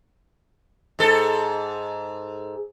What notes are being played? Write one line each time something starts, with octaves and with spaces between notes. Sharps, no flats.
G#2 A4